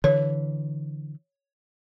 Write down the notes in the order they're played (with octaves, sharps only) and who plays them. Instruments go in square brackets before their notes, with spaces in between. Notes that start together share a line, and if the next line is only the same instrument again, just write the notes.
[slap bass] D3 E3 [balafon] C#5